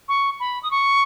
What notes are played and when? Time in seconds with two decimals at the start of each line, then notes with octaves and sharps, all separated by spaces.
0.08 C#6
0.40 B5
0.63 D#6
0.71 C#6